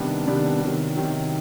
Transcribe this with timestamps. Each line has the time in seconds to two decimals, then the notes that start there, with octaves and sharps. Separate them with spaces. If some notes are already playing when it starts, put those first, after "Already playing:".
Already playing: C3 D#3 G3 B3 D4
0.27 C3 D#3 G3 B3 D4
0.61 C3 D#3 F#3
0.96 C3 D#3 F#3